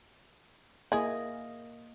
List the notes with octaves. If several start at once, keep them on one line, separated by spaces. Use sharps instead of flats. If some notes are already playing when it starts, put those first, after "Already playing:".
A#3 E4 G#4 D#5